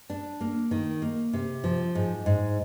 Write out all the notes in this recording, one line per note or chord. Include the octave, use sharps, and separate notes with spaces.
D4
A#3
D#3
A#3
C3
F3
G#2
G#2